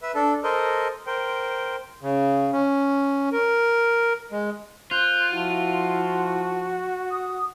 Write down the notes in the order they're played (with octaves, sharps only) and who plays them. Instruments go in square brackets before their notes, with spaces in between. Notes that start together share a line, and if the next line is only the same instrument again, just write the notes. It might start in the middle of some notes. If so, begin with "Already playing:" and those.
[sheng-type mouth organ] B4 E5
D4 A4
A4 A#4 C5 D#5
A#4 C5 G5
[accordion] C#3
C#4
A#4
G#3
[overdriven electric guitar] F4 [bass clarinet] C5 [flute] F#6
[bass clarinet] F3 [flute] E4 [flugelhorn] F#4
[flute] D#6